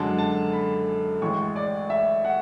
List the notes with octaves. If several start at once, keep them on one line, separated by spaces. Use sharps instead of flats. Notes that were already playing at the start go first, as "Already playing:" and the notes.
Already playing: F#2 D3 G#3 A5
A5
B5
A1 A2 G#3 C#6
D5
E5
F#5